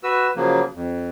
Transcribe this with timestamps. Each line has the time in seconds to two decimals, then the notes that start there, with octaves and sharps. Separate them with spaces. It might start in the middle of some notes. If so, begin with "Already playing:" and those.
0.03 F#4 B4 E6
0.36 C#3 F3 F#3 A#3
0.75 F2